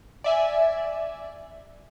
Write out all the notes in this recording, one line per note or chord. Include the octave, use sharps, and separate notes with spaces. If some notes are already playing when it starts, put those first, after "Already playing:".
D5 E5 G#5